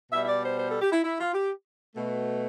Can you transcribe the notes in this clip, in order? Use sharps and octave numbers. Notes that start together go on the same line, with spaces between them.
B2 G3 E5
E5
D5
C5
C5
A4
G4
E4
E4
F4
G4
B2 A3